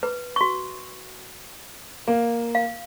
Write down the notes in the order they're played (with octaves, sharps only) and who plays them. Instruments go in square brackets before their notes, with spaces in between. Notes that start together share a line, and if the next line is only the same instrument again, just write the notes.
[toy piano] B4
F#4 C#6
[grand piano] A#3
[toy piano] F5